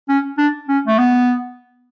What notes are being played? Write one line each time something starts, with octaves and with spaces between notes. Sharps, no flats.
C#4
D4
C#4
A3
B3